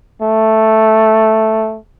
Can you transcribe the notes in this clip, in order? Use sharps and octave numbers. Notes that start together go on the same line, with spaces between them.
A3